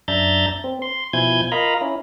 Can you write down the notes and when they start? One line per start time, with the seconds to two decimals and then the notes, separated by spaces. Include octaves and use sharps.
0.08 F#2 D4 E5 A#5 G6 A6
0.64 C4
0.82 C6
1.13 B2 F3 E4 G#5 G6 G#6
1.52 F4 A#4 D#5 F5 A#5 B5
1.81 C#4 E4